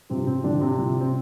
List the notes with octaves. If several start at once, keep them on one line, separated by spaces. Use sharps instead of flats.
G2 C3 F3 C4
C3 C4
C2 A#2 D3 F3 D4
C3 C4
C2 A#2 F3
C4